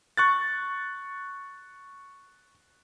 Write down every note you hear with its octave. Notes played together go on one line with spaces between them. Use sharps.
C#6 F#6 A6